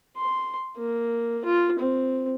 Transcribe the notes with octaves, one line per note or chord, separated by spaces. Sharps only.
C6
A#3
F4
C4